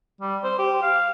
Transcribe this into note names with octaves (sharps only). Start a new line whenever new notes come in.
G3
C5
G4
F5